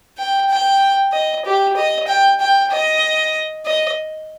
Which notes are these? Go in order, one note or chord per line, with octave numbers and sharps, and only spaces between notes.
G5
G5
D#5
G4
D#5
G5
G5
D#5
D#5